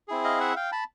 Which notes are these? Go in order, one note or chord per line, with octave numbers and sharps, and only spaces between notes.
C4 E4 G#4
D#5 F5
E5 F#5
F5 G5
A5 B5